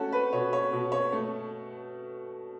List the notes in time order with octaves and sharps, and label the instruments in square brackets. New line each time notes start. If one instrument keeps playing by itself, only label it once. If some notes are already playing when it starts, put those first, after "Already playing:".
Already playing: [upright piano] A3 C#4 F#4 A4
B4
B2 C#5
C#5
B2
C#5
A3